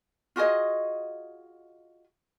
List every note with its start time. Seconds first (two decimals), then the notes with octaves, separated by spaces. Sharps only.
0.36 F4 F#4 G#4 D#5